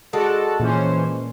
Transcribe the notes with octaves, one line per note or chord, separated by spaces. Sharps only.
G#3 F#4 A4 D5 A5
A#2 E3 C#4 C5